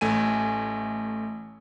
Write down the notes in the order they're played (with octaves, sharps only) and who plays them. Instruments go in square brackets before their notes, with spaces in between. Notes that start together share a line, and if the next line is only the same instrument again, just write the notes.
[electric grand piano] A1 A3 G#5 D#7